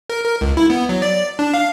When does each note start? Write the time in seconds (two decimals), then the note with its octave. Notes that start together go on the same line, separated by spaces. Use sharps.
0.10 A#4
0.25 A#4
0.41 C#2
0.57 E4
0.70 B3
0.89 F#3
1.02 D5
1.39 D4
1.54 F5